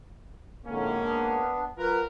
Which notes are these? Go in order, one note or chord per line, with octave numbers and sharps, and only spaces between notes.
F2 A2 D3 G#3 A#3 C#4
B3 D4
F#3 F4 A#4 B4